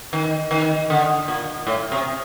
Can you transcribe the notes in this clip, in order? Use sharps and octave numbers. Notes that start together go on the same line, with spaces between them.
D#3
D#3
D3
A#2
A2
C3